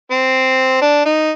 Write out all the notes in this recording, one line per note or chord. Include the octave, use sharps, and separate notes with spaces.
C4
D4
D#4